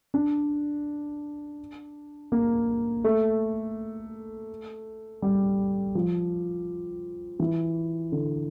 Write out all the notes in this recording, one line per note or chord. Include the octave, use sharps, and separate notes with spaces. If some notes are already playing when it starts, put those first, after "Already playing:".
D4
A#3
A3
G3
F3
E3
D3